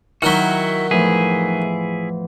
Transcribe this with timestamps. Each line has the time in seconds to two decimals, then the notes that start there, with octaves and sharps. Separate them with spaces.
0.22 D#3 F#3 E4 F#4 F#5 F6
0.91 E2 A2 F3 E4 G#4